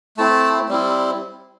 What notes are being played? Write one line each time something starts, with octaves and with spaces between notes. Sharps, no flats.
A3 C4 E4 A5
G3 C4 E4